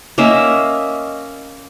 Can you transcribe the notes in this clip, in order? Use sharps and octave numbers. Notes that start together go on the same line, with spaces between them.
A#3 C#4 D#5 E5